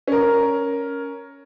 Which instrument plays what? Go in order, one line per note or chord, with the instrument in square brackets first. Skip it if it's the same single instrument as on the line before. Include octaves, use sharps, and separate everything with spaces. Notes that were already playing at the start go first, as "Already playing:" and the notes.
[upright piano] C#4 A#4